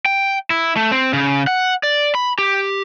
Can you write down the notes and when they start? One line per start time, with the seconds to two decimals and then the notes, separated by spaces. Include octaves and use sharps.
0.06 G5
0.50 E4
0.76 A3
0.92 C4
1.13 C#3
1.47 F#5
1.83 D5
2.15 B5
2.39 G4